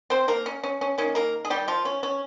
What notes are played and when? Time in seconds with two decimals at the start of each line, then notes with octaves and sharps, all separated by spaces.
0.10 C4 C5
0.28 A#3 A#4
0.46 C#4
0.64 C#4
0.81 C#4
0.98 D#3 A#3 C#4
1.15 A#3 A#4
1.45 G#4
1.50 G3 G4
1.68 F3 F4
1.85 C#4
2.03 C#4